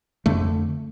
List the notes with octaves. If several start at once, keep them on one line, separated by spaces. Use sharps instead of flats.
F2 D3 A3